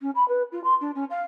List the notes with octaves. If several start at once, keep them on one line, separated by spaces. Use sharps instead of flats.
C#4
B5
B4
F4
C6
D4
C#4
F5